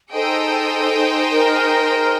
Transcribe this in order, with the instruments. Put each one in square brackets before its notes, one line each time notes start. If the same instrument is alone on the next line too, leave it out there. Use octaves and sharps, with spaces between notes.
[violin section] D#4 G#4 C5 D#5 G5 [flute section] A4
[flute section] A#4